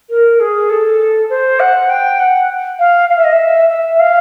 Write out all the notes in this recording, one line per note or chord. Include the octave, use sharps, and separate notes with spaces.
A#4
G#4
A4
C5
F#5
G5
F#5
F5
F5
E5
D#5
E5
E5
F5